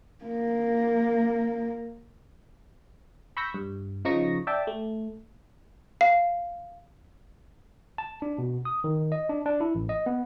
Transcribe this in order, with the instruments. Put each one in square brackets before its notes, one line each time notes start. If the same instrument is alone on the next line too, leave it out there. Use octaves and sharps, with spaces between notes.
[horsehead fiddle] A#3 A#4
[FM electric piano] B5 C#6 E6 G6 A#6 B6
G2
C#3 F3 D#4 D#5 C#6 A#6
D5 E5 G5 A5
A3
[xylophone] F5
[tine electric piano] A5
D4
B2
D#6
D#3
D#5
D4
D4
E4
A1
D#5
B3